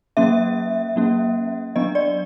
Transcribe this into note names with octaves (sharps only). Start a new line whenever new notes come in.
F#3 A#3 C#4 E5
F#3 A#3 C#4
F#3 B3 D4 D#5
D5